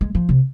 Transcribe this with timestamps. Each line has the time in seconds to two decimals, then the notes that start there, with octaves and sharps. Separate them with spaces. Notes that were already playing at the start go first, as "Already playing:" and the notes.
0.01 G#3
0.15 F3
0.29 C3